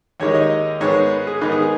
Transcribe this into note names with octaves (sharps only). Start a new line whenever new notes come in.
D#2 D#3 G#3 D#4 C#5
D#5
G#2 D#3 G#3 B3 C#5
B4
G#4
G#2 D#3 B3 D#4 B4
G#4
G#4